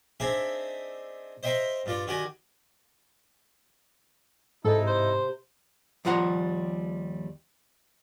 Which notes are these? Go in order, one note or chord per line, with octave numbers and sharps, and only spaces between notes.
C4 D4 D#4 G#4 E5
C5 D#5 E5 G5 A#5 C6
G2 F4 D5
D#3 F#4 G4 D5 G#5
G#2 C3 D#4 E4 A4
C5
D#2 F3 G3 F4 F#5 A#5